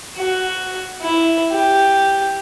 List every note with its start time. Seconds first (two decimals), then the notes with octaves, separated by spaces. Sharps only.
0.17 F#4
1.02 E4
1.52 G4